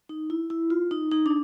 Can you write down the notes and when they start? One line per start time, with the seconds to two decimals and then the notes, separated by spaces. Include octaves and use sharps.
0.09 D#4
0.30 E4
0.50 E4
0.70 F4
0.91 D#4
1.11 D#4
1.26 D4